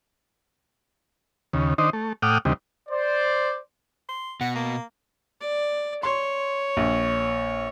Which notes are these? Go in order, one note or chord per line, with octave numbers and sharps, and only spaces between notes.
D#2 C#3
D#3 D4 D#4 C5
A3
A2 F#5 G5 D6 D#6 F6
D2 C3 D#3 G3
C5 D5
C6
B2 F#5
A#3
D5
C#5 C6
A#1